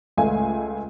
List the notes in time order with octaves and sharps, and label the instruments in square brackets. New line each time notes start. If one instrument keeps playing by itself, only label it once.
[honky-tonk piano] C#2 A3 F5 G#5